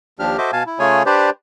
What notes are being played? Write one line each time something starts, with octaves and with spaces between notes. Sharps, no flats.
D#2 F3 D4 G4 F6
F#4 A4 C5 D#5 E5 D6
B2 F5 G#5 A5
E4
C#3 A3 F4 G#4 C#5 G#5
D4 G4 B4 C5 D5